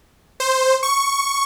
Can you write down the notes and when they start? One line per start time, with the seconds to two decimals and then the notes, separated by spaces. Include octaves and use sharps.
0.40 C5
0.83 C#6